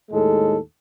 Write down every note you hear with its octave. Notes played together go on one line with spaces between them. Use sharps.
D#2 A2 G#3 A4